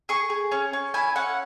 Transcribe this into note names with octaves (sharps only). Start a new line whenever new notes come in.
G#4 C#6
G#4
C#4
C#4
E4 G#5
C#4 F#5